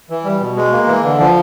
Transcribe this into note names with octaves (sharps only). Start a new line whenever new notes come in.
E3
G3
B2
G#3
A#3
E3
D3
F3